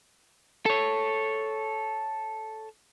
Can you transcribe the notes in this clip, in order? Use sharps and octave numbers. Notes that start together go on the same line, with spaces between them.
A4 C#5